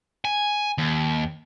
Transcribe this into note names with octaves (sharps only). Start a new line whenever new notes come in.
G#5
D#2